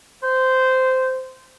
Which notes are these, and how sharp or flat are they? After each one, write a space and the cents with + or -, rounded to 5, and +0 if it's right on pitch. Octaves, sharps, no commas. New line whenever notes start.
C5 -15